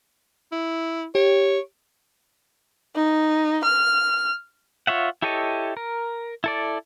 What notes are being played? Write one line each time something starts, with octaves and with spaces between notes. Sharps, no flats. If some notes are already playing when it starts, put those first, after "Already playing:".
E4
G4 C#5
D#4
F6
F4 C#5 E5 F#5
E4 G4 A4 C#5 D#5
A#4
E4 A4 D5